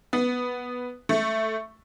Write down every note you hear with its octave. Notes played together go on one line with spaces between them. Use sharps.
B3
A3